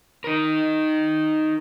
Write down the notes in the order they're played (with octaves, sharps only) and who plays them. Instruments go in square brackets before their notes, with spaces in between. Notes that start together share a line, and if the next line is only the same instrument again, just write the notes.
[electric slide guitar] D#4 A#4